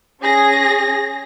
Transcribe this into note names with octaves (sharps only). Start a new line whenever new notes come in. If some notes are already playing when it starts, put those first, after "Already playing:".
C#4 G#4 A#6